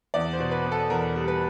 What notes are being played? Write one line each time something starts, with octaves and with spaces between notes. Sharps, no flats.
E2 D5
C5
B2
B4
B3
A4
E2 A#4
G3
B4